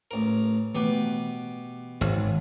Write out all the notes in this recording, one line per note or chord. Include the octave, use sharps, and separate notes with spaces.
A1 A#4
B2 E3 A3 G4 B4
G#1 C5 C#5 A5